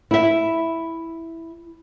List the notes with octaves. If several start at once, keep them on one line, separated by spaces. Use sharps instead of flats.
E4 E5